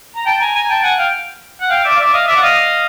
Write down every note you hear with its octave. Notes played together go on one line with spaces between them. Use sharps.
A#5
G5 A5
G#5 A#5
G#5 A#5
G5 A5
F#5 G#5
F5 G5
F#5
F5 G5
D5 E5
F5
D5 E5
D#5 F5
D5 E5
F#5
D#5 F5